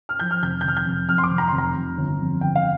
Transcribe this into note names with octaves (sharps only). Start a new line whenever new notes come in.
F6
F3 G6
F6
F1 G6
G6
F1 F6
G6
F1
F2 F6
C6
D6
F1
A#5
F1 C6
A#5
F1
G1
F2
G1 G5
F5